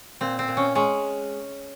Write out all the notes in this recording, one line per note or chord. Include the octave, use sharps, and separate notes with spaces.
A#2 C4
C4
A#2
C#4
G#3 C#4